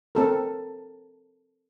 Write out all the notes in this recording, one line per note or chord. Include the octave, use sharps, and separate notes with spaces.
C4 A4 A#4